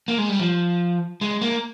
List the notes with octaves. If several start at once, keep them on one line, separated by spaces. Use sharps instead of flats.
A#3
G#3
G3
F3
G#3
A#3